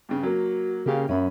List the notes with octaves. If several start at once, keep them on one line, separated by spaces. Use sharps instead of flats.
G2 C#3
F#3 A#3 F#4
C#3 A#3 G4 F5
F#2 C#4 E5 B5